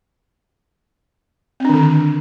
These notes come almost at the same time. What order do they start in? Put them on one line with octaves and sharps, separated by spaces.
C4 D4 D#3 D3